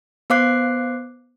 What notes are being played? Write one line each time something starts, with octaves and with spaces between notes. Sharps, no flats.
B3 C5 F5 D6 F#6 C7